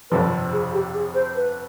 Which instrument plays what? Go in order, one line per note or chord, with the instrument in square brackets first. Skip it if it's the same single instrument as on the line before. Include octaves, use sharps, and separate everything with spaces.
[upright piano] G1 F2 C3 F3 [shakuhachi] B4
[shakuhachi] G#4
G4
G#4
C5
B4